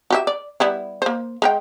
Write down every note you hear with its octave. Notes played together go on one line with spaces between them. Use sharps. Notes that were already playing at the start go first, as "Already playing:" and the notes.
F#4 G4 E5
D5
G3 B3 E4
A#3 C5
G#3 A#4 G5